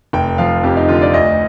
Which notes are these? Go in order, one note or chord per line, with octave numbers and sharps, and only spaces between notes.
F1 G5
F3 F5
F2 G4
D#4
D3 F4
D5
D2 D#5